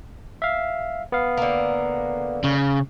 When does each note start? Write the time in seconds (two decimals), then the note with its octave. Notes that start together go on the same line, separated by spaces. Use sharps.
0.42 E5 F5
1.12 B3 F5
1.37 D3 A#3
2.44 C#3